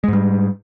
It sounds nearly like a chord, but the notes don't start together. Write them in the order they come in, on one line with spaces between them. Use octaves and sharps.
G#3 G#2 G3